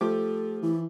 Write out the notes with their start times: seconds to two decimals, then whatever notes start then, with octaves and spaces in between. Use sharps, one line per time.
0.01 F3 A3 G4 A4 D6
0.63 E3 E4